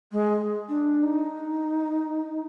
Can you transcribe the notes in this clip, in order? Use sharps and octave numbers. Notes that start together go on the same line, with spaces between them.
G#3
D4
D#4